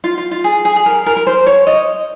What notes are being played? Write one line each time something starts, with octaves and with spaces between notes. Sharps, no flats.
F4
F4
F4
G#4
G#4
G#4
A#4
A#4
A#4
C5
C#5
D#5